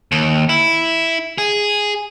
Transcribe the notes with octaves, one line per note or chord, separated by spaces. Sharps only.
D#2
E4
G#4